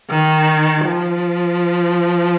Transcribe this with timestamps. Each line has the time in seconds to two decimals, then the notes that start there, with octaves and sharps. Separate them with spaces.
0.10 D#3
0.85 F3